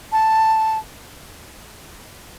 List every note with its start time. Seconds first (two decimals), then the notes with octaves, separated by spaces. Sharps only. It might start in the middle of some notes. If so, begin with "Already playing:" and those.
0.12 A5